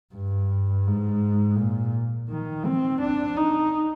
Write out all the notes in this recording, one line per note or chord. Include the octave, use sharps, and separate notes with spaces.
G2
G#2
A#2
D#3
C4
D4
D#4